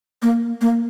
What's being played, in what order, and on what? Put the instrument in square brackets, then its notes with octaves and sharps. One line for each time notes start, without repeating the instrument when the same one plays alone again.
[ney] A#3
A#3